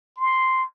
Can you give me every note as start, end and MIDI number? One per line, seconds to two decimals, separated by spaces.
0.17 0.64 84